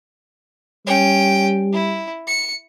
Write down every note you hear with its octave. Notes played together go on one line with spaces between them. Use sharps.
G3 C#4 G5
E4
C#7